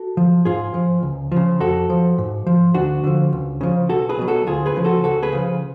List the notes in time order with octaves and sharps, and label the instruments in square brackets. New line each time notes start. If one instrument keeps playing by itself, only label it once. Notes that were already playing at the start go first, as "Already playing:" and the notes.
Already playing: [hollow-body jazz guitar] F#4 A4
F3
G#2 F4 G#4
F3
C#2
C#3 F3
F2 F#4 A4
F3
G#2
F3
D2 D4 F#4
D3 F3
C#2
C#3 F3
B1 F#4 A4
G#4 B4
B2 F#3
F#4 A4
D2 F4 G#4
G#4 B4
C#3 F3
F#4 A4
C#2 F#4 A4
G#4 B4
C#3 F3